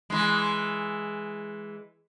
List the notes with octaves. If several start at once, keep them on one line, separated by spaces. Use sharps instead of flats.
E3 G#3